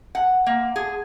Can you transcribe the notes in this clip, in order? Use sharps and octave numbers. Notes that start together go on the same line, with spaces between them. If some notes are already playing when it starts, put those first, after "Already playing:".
F#5
A#3
G#4